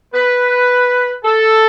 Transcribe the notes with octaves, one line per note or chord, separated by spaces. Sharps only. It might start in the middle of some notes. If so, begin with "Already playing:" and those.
B4
A4